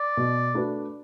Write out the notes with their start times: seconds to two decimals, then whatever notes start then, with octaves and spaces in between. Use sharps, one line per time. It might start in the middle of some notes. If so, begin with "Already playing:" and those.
Already playing: D5
0.17 B2
0.54 A3 D4 F#4 B4